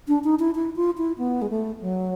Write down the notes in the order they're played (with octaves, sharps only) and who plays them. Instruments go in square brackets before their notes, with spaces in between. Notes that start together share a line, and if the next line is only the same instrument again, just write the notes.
[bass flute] D4
D#4
E4
E4
F4
E4
B3
G#3
A3
F#3